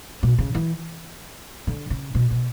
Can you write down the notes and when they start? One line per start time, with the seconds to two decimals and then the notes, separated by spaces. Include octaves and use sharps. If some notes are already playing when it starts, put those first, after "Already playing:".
0.23 B2
0.38 C#3
0.55 E3
1.67 D3
1.90 C#3
2.15 B2
2.31 B2